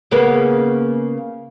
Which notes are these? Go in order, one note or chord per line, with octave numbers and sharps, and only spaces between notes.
C#3 A#3 B3